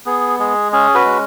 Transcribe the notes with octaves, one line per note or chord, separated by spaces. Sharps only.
B3 G#4
G#3 G#4
C#4 G#4
F#4 B4
G#3